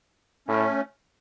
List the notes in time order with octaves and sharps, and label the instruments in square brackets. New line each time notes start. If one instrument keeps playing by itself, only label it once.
[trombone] A2 [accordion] A3 C#4